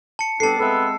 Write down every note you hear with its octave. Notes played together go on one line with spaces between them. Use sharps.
A5 C#7
G3 B3 C4 D4 A4 A5 C7
G#3 B3 C4 B4 E5 E6